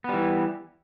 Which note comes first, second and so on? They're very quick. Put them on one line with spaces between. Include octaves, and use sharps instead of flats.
B3 G3 E3